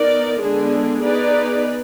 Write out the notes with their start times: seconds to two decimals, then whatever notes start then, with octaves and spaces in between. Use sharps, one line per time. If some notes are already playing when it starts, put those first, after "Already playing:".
Already playing: B3 D#4 A#4 D5
0.42 D3 G#3 B3 D4 G#4
1.04 B3 D#4 G#4 B4 D5